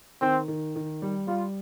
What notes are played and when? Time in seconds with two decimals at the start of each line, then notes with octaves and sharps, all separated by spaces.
0.22 D#3 C4
0.48 D#3
0.76 D#3
1.02 G3
1.27 G3 F4